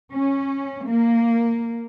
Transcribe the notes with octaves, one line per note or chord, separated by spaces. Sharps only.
C#4
A#3